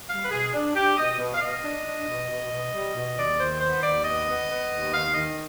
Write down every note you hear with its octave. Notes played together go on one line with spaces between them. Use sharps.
G3 F5
B4
B2 G#4
D4
D4 G4
B2 D#5
B2
F5
B2 D#5
D4
D4
B2
B2
B2
G3
B2
D#2 D5
D#3 C5
B3 C5
D#2 D5
B3 D#5
B3
B3
D#2
D#3 F5
D#3 D#5